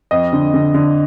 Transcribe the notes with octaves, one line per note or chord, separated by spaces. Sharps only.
F2 D#5
D3
D3
D3